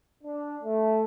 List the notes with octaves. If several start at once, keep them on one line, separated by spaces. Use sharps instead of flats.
D4
A3